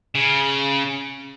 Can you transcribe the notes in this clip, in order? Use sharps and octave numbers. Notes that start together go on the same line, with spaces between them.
C#3